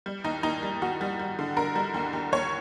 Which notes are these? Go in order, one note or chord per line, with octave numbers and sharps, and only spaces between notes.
G3
D#2 D#4
D#2 D#4
G3
D#2 F#4
G3
G3
D3
D3 A#4
G3
D#2
D#2
D#2 C#5